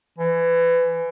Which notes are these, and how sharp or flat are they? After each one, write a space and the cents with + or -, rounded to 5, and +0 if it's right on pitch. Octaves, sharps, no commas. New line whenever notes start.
E3 +25